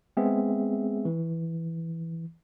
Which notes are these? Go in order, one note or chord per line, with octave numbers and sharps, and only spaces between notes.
G#3 B3 C4 G#4 E5
E3